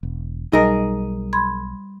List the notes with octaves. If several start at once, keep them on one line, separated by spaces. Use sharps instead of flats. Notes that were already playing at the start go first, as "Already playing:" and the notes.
E1
B1 G3 D#4 G#4 A#4 A#6
B5 C6 G#6